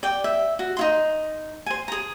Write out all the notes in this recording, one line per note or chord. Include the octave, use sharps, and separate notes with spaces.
D5 G5
E5
F#4
D#4 E4 C6
C5 G#5
G#4 A#5